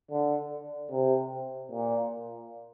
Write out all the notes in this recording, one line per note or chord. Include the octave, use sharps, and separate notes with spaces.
D3
C3
A#2